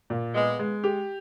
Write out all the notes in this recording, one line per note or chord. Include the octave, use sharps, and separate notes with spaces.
A#2
G#3 B3
G#3
G4